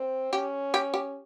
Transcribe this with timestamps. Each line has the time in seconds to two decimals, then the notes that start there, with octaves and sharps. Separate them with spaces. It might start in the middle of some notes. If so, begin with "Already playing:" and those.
Already playing: C4
0.33 C#4 G4
0.74 G4
0.94 G4